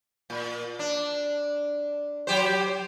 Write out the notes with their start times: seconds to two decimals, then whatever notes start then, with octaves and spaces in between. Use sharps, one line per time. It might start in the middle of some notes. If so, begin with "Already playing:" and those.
0.30 A#2
0.79 D4
2.27 F#3 G4 C5